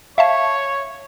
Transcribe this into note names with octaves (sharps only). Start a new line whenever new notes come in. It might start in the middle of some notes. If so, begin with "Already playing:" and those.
C#5 E5 F5 A5